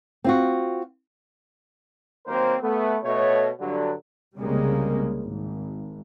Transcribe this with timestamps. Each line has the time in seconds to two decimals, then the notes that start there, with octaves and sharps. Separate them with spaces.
0.24 C4 F4 F#4
2.27 D#3 F#3 A#3 C4 A#4 C5
2.62 A3 B3
3.03 B2 A3 C#5
3.60 G2 D3 F#3
4.36 C2 C#3 G3 G#3 A#3
5.21 G#1